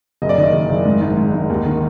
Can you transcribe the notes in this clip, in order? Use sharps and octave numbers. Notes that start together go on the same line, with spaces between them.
F#1 D#5
D5
D#3 D#5
F#1
F#1
G#2
G#1
G#2
G#1
D#2
D#3